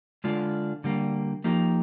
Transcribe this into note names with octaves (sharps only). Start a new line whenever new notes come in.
D3 G#3 D4 F4
D3 G3 A#3
F3 A#3 D#4 G4